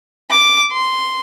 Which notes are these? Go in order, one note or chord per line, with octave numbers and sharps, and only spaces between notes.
D6
C6